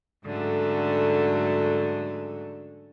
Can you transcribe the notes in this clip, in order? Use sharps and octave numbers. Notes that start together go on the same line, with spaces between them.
G#2 D3 F#3 A3 C#4